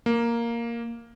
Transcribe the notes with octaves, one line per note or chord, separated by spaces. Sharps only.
A#3